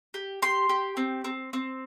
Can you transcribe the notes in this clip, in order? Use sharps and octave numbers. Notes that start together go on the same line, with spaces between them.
G4
G4 C6
G4
C4
C4
C4